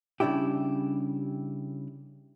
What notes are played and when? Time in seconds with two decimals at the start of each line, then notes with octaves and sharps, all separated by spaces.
0.20 C#3 G3 D4 E4 G4